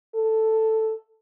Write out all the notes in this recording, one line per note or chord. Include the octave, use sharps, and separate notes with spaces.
A4